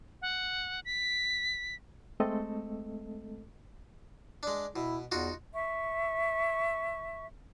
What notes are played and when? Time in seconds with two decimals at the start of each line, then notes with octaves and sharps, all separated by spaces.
0.22 F#5
0.85 B6
2.20 G#3 A3 C4 A4 D#5
4.43 G#3 D4
4.76 B2 E4
5.12 E2 D#4 F4 F#4
5.54 E5 C#6